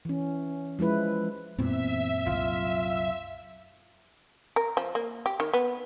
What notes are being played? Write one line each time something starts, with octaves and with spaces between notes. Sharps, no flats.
E3 C#4
F3 G#3 E4 B4
F#2 A#2 E3 B3 C4 E5
C2 F#3 F4
A#4
F3
A#3
G4
D#3
B3